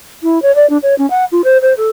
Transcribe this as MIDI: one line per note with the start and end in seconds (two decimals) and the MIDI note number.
0.23 0.41 64
0.42 0.54 73
0.55 0.68 74
0.69 0.77 62
0.82 0.95 73
0.98 1.08 61
1.10 1.24 78
1.31 1.41 65
1.44 1.57 72
1.62 1.73 72
1.77 1.89 69